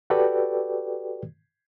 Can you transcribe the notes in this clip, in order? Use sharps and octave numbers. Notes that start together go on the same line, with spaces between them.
F#4 G4 A4 B4 D5 G5